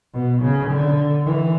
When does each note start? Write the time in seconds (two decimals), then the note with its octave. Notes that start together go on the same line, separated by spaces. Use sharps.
0.14 B2
0.42 C#3
0.69 D3
1.25 E3